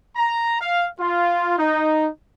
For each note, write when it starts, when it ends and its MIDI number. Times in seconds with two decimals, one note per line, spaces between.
0.16 0.61 82
0.61 0.86 77
1.00 1.55 65
1.59 2.07 63